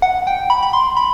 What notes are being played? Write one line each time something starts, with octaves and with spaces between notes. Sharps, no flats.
F#5
G5
B5
B5
C6
B5